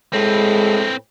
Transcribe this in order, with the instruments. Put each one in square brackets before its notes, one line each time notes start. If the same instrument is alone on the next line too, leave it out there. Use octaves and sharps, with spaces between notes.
[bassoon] A2 [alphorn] G#3 [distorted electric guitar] C4 B4